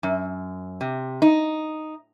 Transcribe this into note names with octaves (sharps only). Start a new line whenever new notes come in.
F#2
C3
D#4